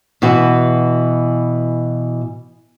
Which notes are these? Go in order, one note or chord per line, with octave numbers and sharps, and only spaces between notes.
B2 E3 F#4